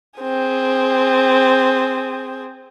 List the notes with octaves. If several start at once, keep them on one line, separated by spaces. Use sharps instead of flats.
C4 G#4